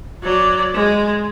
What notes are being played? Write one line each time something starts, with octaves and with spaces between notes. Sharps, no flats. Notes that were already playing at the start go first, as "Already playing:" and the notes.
F#3 D5
G#3